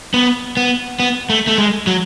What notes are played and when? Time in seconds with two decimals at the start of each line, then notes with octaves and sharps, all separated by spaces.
0.14 B3
0.57 B3
1.00 B3
1.30 A3
1.47 A3
1.58 G#3
1.87 F#3